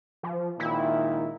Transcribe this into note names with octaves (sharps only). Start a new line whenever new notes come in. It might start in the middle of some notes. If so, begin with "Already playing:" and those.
F3
C#2 A#2 D#3 E4